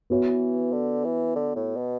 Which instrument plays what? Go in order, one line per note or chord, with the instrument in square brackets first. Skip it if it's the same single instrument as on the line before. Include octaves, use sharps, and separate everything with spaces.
[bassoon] E3 [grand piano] B3 F#4 C#5
[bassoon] D3
E3
D3
A2
B2